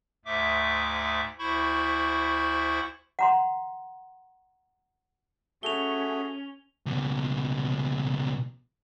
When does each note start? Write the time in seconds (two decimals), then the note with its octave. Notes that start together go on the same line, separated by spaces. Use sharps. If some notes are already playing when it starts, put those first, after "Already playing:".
0.25 D2 G#2 A3 E5 D6
1.39 D2 E4 C5 B5 C#6
3.19 F#5 A#5 C6
5.63 A3 C#4 F#4 G#4 F7 G7
6.86 C#2 B2